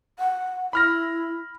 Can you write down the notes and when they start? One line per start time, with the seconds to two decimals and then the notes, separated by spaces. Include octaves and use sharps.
0.19 F#5
0.73 E4 B5 F6 A#6